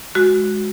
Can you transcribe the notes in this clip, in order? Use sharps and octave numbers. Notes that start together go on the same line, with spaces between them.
G#3 F#4